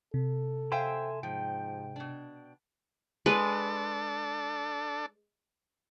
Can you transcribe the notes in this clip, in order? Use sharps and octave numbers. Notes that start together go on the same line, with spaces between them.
C3 A4
C5 E5 F5 G5 G#5 C6
G#2 F3 G5
B2 D4
G#3 D4 A4 B4